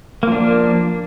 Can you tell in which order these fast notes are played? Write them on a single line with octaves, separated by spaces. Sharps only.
A#3 F3 D4